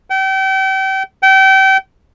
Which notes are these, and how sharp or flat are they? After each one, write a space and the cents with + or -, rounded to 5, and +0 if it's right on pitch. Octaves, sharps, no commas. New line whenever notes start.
G5 -35
G5 -30